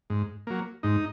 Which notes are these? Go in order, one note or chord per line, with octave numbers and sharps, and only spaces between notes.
G#2
F#3 A#3
G#2 D#4